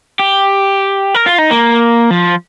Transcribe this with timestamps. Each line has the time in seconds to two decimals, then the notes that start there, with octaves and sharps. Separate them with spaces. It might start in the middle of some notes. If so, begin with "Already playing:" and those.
0.19 G4
1.14 A#4
1.26 F4
1.38 D#4
1.51 A#3
2.11 F3